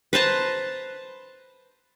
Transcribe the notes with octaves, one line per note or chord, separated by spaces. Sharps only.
B4 C5 A5 A#5